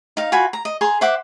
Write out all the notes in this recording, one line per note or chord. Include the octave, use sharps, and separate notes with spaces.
D#4 F5
F4 F#4 G#5 B5
A#5
D#5
G#4 A#5 C6
C5 E5 F#5 D6